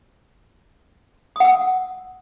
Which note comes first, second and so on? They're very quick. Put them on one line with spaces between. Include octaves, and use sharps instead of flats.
D#6 F#5 E6